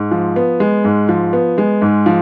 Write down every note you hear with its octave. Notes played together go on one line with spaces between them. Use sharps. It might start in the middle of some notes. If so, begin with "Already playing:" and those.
Already playing: G#2
F3
B3
G#3
G#2
F3
B3
G#3
G#2
F3